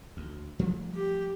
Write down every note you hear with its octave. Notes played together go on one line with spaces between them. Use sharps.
D2
F3 G3 A3
G4